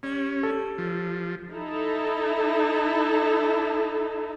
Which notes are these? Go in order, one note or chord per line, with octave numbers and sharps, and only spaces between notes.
G3 C#4
G3 A4
F3
D#4 E4 A4